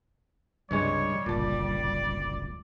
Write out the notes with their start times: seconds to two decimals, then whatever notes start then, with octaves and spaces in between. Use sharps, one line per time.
0.71 C#2 G2 C3 G3 G#3 C#5
1.26 D1 G1 C#2 A#2 D5 A5